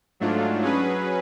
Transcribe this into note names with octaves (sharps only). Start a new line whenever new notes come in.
G#2 F#3 A3 D4 F4
F#3 C#4 G#4 B4